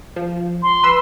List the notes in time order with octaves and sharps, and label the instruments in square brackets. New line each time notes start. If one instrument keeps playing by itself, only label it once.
[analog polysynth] F3
[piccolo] C6
[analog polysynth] B4 E6